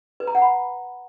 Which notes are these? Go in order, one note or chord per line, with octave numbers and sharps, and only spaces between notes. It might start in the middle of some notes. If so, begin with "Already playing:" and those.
B4
A#5
F#5
B5